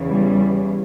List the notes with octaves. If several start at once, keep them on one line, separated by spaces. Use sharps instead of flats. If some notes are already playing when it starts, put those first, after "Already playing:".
Already playing: E2 C#3 E3
G3